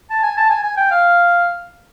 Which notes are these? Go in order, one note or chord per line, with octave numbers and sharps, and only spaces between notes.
A5
G#5
A5
G#5
G#5
G5
F5